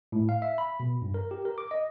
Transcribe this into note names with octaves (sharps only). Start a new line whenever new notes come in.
A2
F5
E5
B5
B2
G2
A#4
G4
A#4
D6
D#5